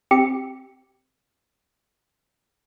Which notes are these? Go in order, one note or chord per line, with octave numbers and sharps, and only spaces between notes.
C4 G4 C#7